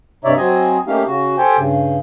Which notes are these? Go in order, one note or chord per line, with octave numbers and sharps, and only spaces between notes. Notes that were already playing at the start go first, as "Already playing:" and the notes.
G2 C3 D#4 C#5 D5 E5
F#3 C4 D#5 G#5
A3 A#3 C#4 D#4 G4 F5
C#3 F#4
G4 A4 C5 G5 G#5
G2 C#3